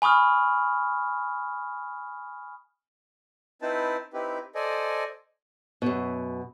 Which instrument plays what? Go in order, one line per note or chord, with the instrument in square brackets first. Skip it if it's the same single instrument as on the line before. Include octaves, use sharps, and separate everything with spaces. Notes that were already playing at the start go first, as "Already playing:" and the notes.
[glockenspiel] G#5 B5 C#6 D#6 F6
[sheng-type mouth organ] C4 D#4 E4 B4 C5 A5
C4 D#4 E4 G4 B4
A4 C5 D5 D#5 G#5
[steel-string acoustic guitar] F#2 B2